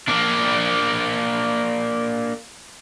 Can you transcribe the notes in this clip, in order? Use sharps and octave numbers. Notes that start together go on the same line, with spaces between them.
A#3 D4